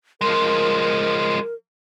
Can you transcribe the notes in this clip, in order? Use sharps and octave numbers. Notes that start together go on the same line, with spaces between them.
F3 G#3 A#4